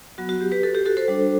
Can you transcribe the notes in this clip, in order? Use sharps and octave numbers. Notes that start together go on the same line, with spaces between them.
F#3 B3 F#4
F#4
G4
G4 B4
F#4 A4
G4
F#4 A4
A4 C5
G3 D4 F#4